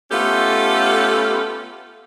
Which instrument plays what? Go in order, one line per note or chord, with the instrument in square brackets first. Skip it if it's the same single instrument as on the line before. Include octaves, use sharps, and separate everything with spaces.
[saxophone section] A3 B3 C#4 F4 G4 A4